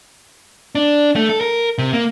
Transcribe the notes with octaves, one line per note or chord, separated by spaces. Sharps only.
D4
A3
A4
A#4
C3
A#3